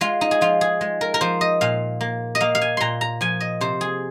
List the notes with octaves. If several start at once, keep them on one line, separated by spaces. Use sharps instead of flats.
G#3 F4
D#4
G#4
F3 F4
G#4
G#3
A#4
A#4
F3 C5
D#5
A#2 F5
A#3
D#5
A#3 F5
F5
G#5
A#2 A#5 C6
A#5
F3 G#5
D#5
C3 C5
G#4